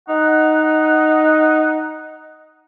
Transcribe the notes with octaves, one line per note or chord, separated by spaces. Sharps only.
D#4 F#5